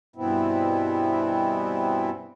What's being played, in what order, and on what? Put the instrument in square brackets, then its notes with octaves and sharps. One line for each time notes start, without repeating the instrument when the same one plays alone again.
[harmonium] G2 B2 E3 B3 C4 E4